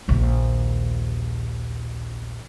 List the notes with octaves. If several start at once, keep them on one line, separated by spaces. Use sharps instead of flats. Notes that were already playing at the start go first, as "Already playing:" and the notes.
A#1 D#2